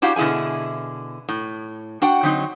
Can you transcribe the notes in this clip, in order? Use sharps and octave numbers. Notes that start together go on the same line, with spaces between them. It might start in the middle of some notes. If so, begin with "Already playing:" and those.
D4 E4 F#4 G4 F5
B2 D3 E4 G#4 G#5
A2
D4 F#4 F#5 G5
D3 F#3 C4 D#4